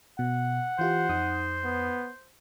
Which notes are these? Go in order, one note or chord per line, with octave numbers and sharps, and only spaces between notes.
B2 F#5
E3 F4 G4 C5
F2 D#4 D#6
B3